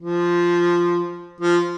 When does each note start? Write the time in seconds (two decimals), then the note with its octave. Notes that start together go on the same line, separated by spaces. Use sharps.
0.01 F3
1.41 F3